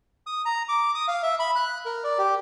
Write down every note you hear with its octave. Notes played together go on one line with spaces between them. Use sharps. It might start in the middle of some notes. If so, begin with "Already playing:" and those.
D#6
A#5
D6
D#6
F5
E5
B5
F#6
A#4
D5
G4